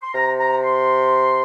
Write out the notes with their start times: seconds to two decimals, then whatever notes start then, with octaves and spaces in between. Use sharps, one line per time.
0.03 C6
0.14 C3 A#5
0.39 A#5
0.64 C6